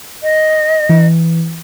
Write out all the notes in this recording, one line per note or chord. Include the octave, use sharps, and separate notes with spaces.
D#5
E3